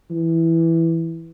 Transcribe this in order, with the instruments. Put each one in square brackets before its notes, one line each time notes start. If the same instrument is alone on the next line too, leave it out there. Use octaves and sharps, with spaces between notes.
[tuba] E3